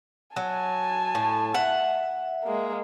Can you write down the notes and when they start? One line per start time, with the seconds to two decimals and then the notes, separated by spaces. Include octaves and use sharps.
0.36 F#3 G#5 A5
1.15 A2
1.54 E5 F#5
2.44 G#3 A#3